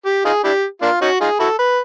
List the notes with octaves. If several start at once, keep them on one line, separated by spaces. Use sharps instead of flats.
G4
D#4 F4 G#4
D4 E4 G4
A#3 D4 F4
C#4 D#4 F#4
D#4 F4 G#4
E4 F#4 A4
B4